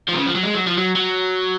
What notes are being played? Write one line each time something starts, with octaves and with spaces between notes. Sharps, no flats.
F3
C3
C#3
F3
F#3
G#3
F#3
F3
F#3
F#3